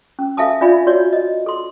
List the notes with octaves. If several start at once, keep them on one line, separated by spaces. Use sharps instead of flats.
C#4
A4 E5 F5 G#5 A5 D#6
D4 F4 D5 E5 G#5 B5
F#4 C#5 D5
D#5
A4 C6